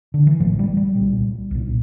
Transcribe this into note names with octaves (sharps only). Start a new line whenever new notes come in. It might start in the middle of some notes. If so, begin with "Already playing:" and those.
D3
E3
A1 A2 F3
G3
G3
C2 A#2
C2 A#2